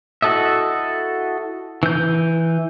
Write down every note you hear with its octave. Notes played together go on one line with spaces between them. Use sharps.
E4 F#4 A4 D#5 E5
E3 G6